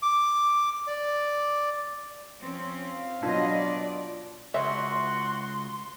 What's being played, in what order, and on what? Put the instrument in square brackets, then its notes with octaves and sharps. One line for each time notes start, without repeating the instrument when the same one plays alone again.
[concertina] D6
D5
[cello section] F3 C4 C#4
[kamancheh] F5
[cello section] B2 F#3 D#5 [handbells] D4 F4
[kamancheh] D5
[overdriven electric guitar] C#2 [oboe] F#4 [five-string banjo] E5 [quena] C6